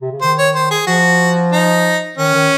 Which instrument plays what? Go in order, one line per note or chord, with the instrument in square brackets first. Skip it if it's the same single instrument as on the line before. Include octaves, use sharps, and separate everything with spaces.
[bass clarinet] C3
C#3
[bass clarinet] D#3 [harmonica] C5
[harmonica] C#5
C5
G#4
[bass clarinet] F3 [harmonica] F#4
[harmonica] D#4
[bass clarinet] D#3 [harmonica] C#4
[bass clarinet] D#3